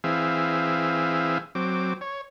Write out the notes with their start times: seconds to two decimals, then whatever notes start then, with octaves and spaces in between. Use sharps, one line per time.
0.04 E3 C4 G#4 E5 F5
1.55 F#3 C4 D6
2.01 C#5